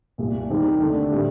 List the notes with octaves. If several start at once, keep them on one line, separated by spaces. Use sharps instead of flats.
C2 A#2 G3
D#2 D#3 G3 C4 G4
D3 A3 D4
A2 G3 C4 G4